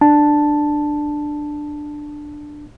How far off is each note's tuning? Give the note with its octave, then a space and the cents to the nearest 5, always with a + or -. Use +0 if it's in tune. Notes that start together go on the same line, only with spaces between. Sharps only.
D4 +10 A5 +0